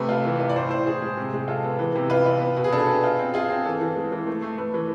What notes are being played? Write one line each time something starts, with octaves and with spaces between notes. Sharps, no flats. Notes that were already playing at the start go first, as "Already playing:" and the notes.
Already playing: C3 A3 B4
F4
E3
F4
D5
A2 C5
A2 C5
A2 G#4
G#3
C3
G#3
F4 A4
B3
E3
C3
F4 B4
F4
B3
B2
G#4
D4 A4
B3
F4
C4
F4 G#4
C4
E3 A4
E3
G#3
E3
A3
A3
A3 B4
E3